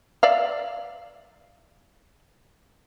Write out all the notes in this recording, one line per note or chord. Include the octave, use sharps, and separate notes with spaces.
D5 E5 F5